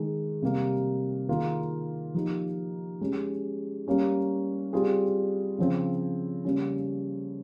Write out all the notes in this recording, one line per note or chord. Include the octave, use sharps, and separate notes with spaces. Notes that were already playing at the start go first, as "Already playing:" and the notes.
Already playing: D#3 G#3 D#4
C3 G3 A#3
D#3 A#3 F4 G#4
F3 A#3 D#4 G4
G#3 C#4 G4
G3 A#3 C#4 G4
G3 C4 F4 G#4
C#3 F3 C4
C#3 G3 A#3 C#4